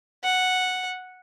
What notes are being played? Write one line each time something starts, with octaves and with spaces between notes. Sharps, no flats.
F#5